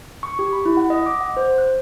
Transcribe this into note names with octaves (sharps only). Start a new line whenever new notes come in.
C#6
G4
B5
E4
F#5
D#5
D6
F#5
C5
F#6